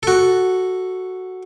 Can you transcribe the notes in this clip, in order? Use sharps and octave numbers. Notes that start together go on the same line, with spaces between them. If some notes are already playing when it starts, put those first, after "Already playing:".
F#4 A4